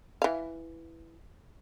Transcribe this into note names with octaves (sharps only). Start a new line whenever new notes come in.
E3 F5